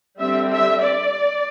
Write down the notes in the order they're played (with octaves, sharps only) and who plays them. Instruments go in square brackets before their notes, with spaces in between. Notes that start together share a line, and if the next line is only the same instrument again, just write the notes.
[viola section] D3 G3 C4 E5
E5
D5